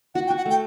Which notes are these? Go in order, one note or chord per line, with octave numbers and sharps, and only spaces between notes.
F#4 F#5
G5
F#4
F#5
A3 G5